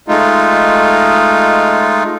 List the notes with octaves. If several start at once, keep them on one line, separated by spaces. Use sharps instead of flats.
G#3 A3 D#4 F4